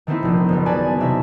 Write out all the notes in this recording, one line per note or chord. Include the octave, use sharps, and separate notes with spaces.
D#3 A3 B3 C4 D#4 E4
F1 A#1
F#1 B3
B4 D5 G#5 A5
E1 C3 D#4 E5 E7